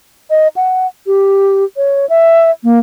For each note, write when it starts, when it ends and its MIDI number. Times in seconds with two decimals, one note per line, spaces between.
0.30 0.48 75
0.56 0.87 78
1.07 1.64 67
1.77 2.08 73
2.09 2.51 76
2.64 2.79 58